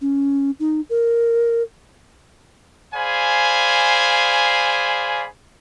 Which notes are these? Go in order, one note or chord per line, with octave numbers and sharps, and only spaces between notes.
C#4
D#4
A#4
G#4 C5 D5 F5 G#5 B5